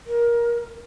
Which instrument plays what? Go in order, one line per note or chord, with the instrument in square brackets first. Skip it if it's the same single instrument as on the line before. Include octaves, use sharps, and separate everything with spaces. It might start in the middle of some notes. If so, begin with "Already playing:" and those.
[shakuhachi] A#4